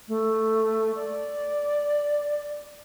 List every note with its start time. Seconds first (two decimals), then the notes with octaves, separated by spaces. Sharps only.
0.08 A3
0.95 D5